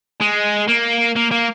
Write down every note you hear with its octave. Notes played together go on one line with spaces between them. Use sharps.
G#3
A#3
A#3
A#3